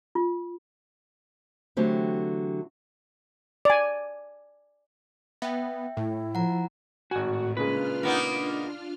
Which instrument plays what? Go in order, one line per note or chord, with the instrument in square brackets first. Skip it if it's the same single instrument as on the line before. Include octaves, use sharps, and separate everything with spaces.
[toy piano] F4
[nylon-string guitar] D3 E3 F#3 A3 C4 G4
[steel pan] D5 G#5
[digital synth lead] B3 [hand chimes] E5 G5
[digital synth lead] A2 [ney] E4
[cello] F3 [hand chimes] F#5 A#5
[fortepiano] G#1 G#5 [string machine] A2 [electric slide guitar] F#4
[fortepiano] A#2 C#3 G#3 [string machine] D4 F4 F6 [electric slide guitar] B4
[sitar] A#3 B3 D#4